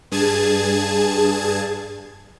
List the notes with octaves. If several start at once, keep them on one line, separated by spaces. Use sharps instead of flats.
G2 G#4 A5 G#6